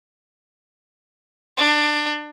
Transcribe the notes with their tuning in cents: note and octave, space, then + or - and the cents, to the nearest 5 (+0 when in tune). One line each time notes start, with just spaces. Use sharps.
D4 +20